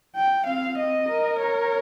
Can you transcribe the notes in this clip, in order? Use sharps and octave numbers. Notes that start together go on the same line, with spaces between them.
G5
C4 F5
C4 D#5
A#4
C#5